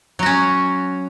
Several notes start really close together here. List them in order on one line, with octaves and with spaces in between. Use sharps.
F#3 F#4 C#4